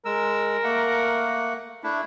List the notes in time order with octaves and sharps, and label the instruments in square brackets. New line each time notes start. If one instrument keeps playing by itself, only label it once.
[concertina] G#3 E6 [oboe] A#4
[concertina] A3 A#3 F#5
A3 D4 E4